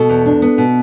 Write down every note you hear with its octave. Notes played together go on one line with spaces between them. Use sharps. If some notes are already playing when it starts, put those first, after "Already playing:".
Already playing: B2 A4
E2
D4
B3
B2